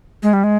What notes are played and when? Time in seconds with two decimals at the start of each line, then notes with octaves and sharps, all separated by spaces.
0.23 G#3
0.33 G3
0.44 G#3